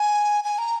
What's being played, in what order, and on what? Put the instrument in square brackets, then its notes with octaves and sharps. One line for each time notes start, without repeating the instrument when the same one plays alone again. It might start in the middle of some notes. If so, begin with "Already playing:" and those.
Already playing: [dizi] G#5
G#5
A#5